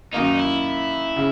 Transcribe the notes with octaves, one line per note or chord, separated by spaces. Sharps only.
F#2 D#3 A#3 D#4
E4
C#3